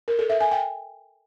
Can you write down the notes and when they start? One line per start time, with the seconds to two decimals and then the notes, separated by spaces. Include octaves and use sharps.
0.08 A#4
0.19 A4
0.30 E5
0.40 G#5
0.51 G5